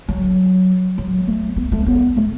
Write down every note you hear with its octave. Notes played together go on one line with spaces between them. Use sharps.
F#3
F#3
A3
B3
A3
B3
A3